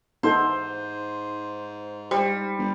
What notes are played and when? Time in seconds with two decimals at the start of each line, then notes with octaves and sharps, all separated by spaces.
0.23 G#2 B3 D#4 A4 C5
2.11 G3 C5
2.58 G1